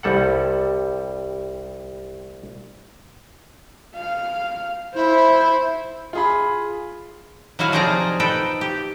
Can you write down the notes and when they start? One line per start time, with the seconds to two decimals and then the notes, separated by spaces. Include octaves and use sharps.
0.03 C2 G3 A4 F#5
3.95 F5
4.95 E4 C5
6.13 F4 G#4 B5
7.59 F#3 E4 F#4 F5 G#5
7.72 C3 F3 D#4 G#4 D5 A#5
8.20 D#4 A4 B4 G5
8.61 G4